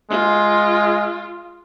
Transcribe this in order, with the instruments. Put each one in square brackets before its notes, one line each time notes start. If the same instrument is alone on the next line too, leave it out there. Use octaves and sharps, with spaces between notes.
[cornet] G#3 [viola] F4